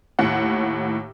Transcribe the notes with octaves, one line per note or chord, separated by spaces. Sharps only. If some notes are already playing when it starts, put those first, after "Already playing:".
D#2 A2 F#5